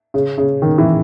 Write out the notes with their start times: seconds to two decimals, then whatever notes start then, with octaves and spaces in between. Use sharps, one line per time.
0.14 C#3
0.38 C#3
0.62 D#3
0.78 E3